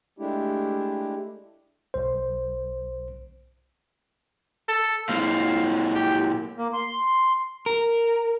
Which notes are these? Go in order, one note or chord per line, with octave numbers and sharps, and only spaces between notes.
G#3 A3 D4 E4 G4
B1 C5
A4
A#2 G#3 F5
G4
A#3
C6
A#4